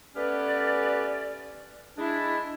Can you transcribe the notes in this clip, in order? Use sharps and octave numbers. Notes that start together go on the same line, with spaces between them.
A3 B3 C#4 G4 B4 D5
G#3 D4 E4